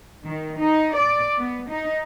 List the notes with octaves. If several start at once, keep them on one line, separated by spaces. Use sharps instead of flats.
D#3
D#4
D5
B3
D#4